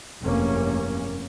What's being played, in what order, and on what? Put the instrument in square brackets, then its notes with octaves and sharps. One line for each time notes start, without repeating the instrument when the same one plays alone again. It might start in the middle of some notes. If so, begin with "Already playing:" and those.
[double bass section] F1 E2 G2 A#3 C#4